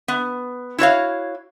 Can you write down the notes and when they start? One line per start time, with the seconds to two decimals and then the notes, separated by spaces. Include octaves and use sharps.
0.08 B3
0.78 E4 F#4 C#5 F5